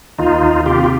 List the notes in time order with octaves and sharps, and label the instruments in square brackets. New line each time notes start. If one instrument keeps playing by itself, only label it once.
[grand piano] D#2 [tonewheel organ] D#4 F4
[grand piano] D#2
[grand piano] C3 [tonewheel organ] F4 G4
[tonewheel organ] G4